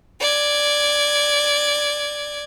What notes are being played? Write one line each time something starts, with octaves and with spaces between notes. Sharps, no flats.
D5 G#6